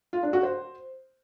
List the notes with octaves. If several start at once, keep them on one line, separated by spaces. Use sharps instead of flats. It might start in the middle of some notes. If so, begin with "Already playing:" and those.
F4
D4
F#4
C5